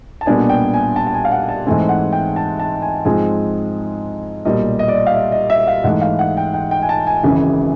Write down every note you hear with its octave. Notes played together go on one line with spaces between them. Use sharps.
A5
B1 A#2 G3 B3 D4 G#5
G5
G#5
A5
A5
G#5
F5
F#5
A5
G#2 E3 A3 C4 G#5
F#5
G5
A5
A5
G#5
G#2 F3 G#3 C4 G#5
B1 A#2 G3 D#5
D#5
D5
D#5
F5
E5
D#5
E5
F5
G#2 E3 A3 F#5
F5
F#5
G5
G5
G5
G#5
A5
G#5
G#1 F#2 C#3 E3